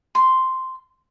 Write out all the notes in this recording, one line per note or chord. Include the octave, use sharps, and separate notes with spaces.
C6